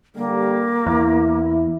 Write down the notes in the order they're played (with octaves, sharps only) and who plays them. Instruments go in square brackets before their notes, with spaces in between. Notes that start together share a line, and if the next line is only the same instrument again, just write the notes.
[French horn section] D3 G3 [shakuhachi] A#3
[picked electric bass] E2 [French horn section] E4